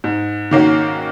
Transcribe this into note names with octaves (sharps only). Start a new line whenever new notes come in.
G#2
D#3 A#3 C#4 F#4